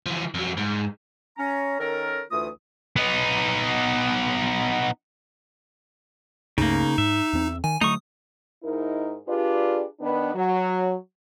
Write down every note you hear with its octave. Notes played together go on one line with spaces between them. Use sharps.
E3 F3
F2 F#3
G#2
C#4 A#5
D#3 C#4 A4 A#4
D2 E3 A3 F4 D#6
B3 D#4
C#2 G2 C#3 A3 A#3 D#4
G#2 E5
E2 C4
D#3 G#5
D3 F#3 A3 D#4 C#6 D#6
G#2 D#4 E4 A#4
D4 F4 G4 G#4 B4 D5
D#3 B3 D4 B4
F#3